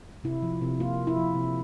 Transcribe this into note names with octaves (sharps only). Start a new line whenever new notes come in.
C3 E4
F3
C3
A#3 F4
C3
E4
F3
C3